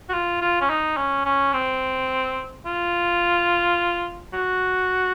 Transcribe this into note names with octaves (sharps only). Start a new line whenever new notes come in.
F#4
F4
F4
C#4
D#4
C#4
C#4
C4
F4
F#4